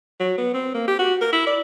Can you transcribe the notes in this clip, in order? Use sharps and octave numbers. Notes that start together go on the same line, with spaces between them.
F#3
B3
C4
A#3
G4
F#4
A#4
E4
D5